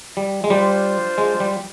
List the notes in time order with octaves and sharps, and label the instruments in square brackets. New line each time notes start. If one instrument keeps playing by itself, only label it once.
[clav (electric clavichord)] G3
G#3
[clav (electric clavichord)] G3 [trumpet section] D4 F4 C5
[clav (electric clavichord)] G#3
G3